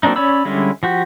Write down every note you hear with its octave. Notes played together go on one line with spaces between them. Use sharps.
F#3 A#3 C4 D4 D#4
C#4 C#5 D5 B5 E6
D3 G3 G#3 C#4 E4
F3 F#4 G4